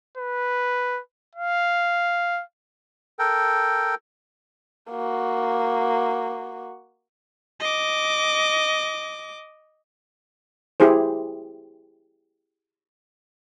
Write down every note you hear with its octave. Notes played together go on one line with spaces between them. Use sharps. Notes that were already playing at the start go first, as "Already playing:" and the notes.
B4
F5
A4 A#4 G5
A#3 F#4
D#5 D6
E4 G4 G#4 C5